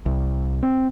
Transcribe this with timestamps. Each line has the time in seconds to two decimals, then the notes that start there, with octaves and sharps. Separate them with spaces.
0.06 C2
0.63 C4